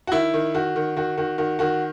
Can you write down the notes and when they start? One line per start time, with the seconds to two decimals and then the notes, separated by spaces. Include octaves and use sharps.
0.07 F#4
0.12 D#3 E4
0.34 D#3
0.54 D#3 F#4
0.76 D#3
0.96 D#3 F#4
1.17 D#3 F#4
1.38 D#3 F#4
1.59 D#3 F#4